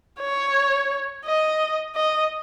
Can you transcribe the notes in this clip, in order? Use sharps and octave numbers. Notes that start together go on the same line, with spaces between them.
C#5
D#5
D#5